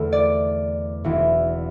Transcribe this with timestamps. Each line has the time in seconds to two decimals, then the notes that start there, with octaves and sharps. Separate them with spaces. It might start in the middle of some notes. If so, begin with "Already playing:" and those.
Already playing: E2 D3 A3 E4 C5
0.12 D5
1.04 E1 E2 E3 C4